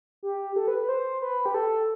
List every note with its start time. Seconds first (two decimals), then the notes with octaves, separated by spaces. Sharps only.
0.23 G4
0.56 A4
0.68 B4
0.78 B4
0.88 C5
1.22 B4
1.46 G4
1.54 A4